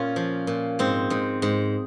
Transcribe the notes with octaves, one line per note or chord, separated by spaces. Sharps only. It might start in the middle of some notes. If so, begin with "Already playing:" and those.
Already playing: A#2 C#4 F4
F3
A#2
G#2 C4
G#2
G#2